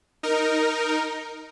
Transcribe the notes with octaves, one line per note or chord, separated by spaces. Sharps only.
D#4 A#4